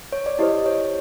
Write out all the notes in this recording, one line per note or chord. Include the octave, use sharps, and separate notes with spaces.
C#5
D5
E4 G4 C5 D#5
C#5